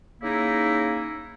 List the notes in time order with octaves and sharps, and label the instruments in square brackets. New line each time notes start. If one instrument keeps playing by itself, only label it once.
[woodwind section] C#3 A#3 D#4 E4